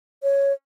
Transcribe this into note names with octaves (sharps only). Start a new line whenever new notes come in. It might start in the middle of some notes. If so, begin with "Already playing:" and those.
C#5